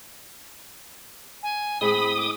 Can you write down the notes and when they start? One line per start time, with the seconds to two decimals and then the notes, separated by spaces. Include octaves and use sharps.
1.42 G#5
1.81 A2 G#3 C4 B5 D#6
2.16 D6